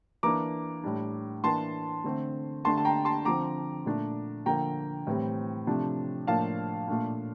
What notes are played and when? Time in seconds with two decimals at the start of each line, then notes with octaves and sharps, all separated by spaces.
0.23 E3 A#3 D4 A#5 D6
0.84 A2 G3 D4
1.44 E3 A#3 D4 A5 C6
2.04 D3 A3 C4
2.65 D3 A3 D4 A5 C6
2.77 A5
2.85 G5 A#5
3.05 A5 C6
3.25 D3 F3 C4 A#5 D6
3.86 A#2 A3 D4
4.46 D3 F3 A#3 G5 A#5
5.07 A2 E3 G3 C4
5.67 C3 F3 A3 D4
6.27 A2 F3 A#3 D4 F5 A5
6.88 A#2 A3 D4